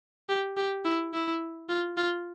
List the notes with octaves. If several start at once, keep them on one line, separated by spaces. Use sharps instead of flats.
G4
G4
E4
E4
F4
F4